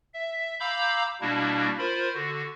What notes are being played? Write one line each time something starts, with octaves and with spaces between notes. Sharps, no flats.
E5
F5 A#5 B5 D6 E6 G6
B2 G3 A#3 D4 E4 F#4
F4 A#4 C5 B5
D3 F#4